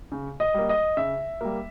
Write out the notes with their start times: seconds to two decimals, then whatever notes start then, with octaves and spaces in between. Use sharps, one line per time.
0.12 C#3
0.40 D#5
0.54 G3 A#3
0.69 D#5
0.97 C#3 E5
1.41 G3 A#3